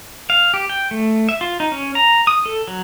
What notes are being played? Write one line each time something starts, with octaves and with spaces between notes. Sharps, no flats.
F5
G4
G5
A3
E5
F4
D#4
C#4
A#5
D#6
A4
F#3